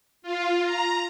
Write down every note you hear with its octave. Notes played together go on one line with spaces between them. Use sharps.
F4
A#5